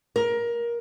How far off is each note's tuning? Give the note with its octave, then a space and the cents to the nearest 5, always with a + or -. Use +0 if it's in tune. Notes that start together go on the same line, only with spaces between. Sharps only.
A#4 +20